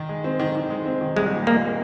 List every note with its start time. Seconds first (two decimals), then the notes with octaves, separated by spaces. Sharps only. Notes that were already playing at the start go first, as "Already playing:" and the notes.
Already playing: D#3
0.09 G#3
0.24 C4
0.39 D#3
0.55 D#3
0.70 G#3
0.86 C4
1.01 D#3
1.16 C2 G#3
1.31 A#2
1.47 G#3 A#3